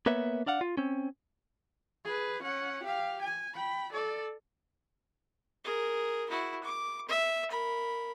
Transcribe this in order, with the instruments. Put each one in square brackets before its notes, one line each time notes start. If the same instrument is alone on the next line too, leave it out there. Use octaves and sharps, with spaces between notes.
[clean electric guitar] A#3 B3 B4 C#5 E5
D4 D5 F5 F#5
F4
C4 C#4
[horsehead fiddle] G#4 B4
C#4 F#5
G4 F5
G#5
G5 B5
A4 D5
[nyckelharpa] G#4 A#4
E4 F#4
D6
E5
A#4 B5